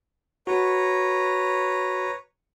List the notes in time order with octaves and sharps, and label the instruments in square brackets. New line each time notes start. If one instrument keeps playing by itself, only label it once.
[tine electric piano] F#4 [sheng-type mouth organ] B4 C#5 A#5